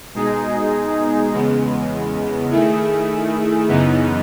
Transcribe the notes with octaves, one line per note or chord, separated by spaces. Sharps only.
B2 G#3 D#4 G#4
E2 C#3 G#3 B3
D#3 A3 E4 G#4
F#2 C#3 E3 B3 D#4